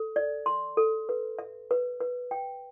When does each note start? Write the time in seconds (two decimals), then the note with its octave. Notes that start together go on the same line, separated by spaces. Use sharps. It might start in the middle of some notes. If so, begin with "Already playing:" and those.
Already playing: A4
0.16 D5
0.46 C6
0.77 A4
1.09 B4
1.39 E5
1.71 B4
2.01 B4
2.31 G5